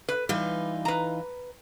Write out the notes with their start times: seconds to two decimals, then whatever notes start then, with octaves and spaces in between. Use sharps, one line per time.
0.09 B4
0.29 E3 G3 D#4 F4
0.85 B4 A#5